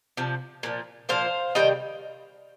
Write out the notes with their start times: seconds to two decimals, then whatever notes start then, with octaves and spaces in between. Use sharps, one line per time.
0.17 C3 F3
0.63 A#2 F3
1.09 A#2 F3 C5 F5
1.55 C3 D#3 G3 D#5 G5